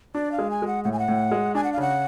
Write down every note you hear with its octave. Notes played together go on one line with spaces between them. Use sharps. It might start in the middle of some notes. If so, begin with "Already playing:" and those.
D4 D5
F5
G#3
G#5
G#3 F#5
A2 F#5
G#5
F#5
A2
G#3
D4 G#5
F#5
F5
C#3 F#5